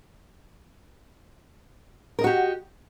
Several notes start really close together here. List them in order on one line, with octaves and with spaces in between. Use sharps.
A#4 D#5 F#4 G4